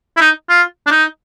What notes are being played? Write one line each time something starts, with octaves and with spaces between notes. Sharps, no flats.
E4
D#4
F4
D4
D#4